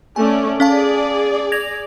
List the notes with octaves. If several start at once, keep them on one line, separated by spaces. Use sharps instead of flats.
A3 C#4 D5 G#5
C#4 G#4 D5 F5 A5
G#6 A#6 F7